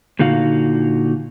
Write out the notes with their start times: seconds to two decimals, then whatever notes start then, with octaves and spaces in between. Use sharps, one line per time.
0.19 A#2 D3 D#4 F#4 F5